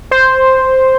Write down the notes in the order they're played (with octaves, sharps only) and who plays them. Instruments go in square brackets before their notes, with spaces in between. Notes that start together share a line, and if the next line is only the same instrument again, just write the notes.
[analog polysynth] C5